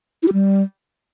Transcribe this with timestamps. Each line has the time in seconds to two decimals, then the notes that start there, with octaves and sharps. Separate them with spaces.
0.23 E4
0.28 G4
0.33 G3